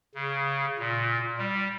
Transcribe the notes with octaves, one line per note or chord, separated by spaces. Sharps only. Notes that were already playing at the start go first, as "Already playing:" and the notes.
C#3
A#2
G3